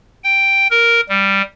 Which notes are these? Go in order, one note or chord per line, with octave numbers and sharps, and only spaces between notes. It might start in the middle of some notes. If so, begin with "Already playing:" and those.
G5
A#4
G3